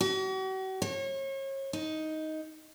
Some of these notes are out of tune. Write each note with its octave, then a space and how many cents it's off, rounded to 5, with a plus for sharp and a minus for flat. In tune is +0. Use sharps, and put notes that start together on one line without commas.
F#4 +45
C#5 -35
D#4 +10